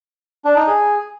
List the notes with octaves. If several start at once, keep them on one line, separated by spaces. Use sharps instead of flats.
D4
D#4
G#4